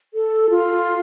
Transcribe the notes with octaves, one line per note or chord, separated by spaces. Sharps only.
A4
F4